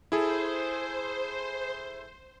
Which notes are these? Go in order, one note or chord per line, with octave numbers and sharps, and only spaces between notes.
E4 G#4 A4 C5